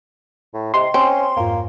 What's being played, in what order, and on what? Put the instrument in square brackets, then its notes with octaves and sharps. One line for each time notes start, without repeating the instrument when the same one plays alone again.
[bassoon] A2
[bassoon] C3 [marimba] G4 D#5 G5 [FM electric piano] C6
[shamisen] C4 [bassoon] C#4
[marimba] F2 G#2 F4 [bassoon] A#3